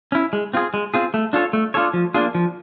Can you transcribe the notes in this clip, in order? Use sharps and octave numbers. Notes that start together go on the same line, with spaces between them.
C#4 E4
G#3
C4 F4 G#4
G#3
C4 F4 G#4
A3
D4 F4 A4 C#5
A3
D4 F4 A4 C#5
F3
A#3 D4 F4 G#4
F3